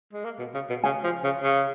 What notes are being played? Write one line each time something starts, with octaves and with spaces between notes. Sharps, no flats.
G#3
A#3
B2
C#3
B2
C#3 G#5
F3
C#3
C#3